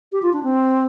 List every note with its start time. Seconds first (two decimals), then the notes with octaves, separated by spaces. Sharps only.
0.12 G4
0.22 F4
0.33 D4
0.43 C4